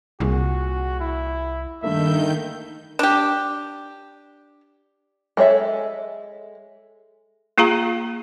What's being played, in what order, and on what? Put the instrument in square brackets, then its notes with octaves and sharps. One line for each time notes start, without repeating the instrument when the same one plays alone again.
[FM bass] C2 [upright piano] A#2 G#4 [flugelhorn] F#4
[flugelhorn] E4
[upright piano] G2 A3 A#3 [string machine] D#3 G6 [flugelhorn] E5
[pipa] D4 G4
[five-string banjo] G#3 A4 C#5 E5
[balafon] A#3 F4 G#4 F5 A#5